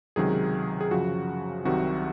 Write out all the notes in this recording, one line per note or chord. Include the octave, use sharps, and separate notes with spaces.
C#2 C3 D#3 F#3 G#4
G#4
F#2 C#3 F3 F#4
C2 C3 D#3 F#3 F#4